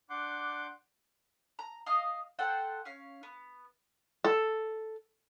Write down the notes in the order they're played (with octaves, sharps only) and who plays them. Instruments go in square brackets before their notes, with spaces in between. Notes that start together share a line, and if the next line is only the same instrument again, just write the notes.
[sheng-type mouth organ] D4 F#5 C6 D6 G6
[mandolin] A#5
D#5 F5 D#6
A4 C5 F#5 G5
C#4 F5
B3
[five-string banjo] A4